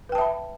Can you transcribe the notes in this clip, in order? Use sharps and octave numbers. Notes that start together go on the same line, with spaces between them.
B4 E5 G5 A5 B5